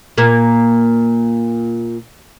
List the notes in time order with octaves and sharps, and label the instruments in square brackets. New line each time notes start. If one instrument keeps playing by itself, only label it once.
[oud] A#2 A#3